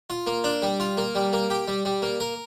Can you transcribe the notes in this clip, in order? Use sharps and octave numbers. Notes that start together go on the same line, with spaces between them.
F4
A#3
D4
G3
F4
A#3
G3
A#3
G4
G3
G3
A#3
A#4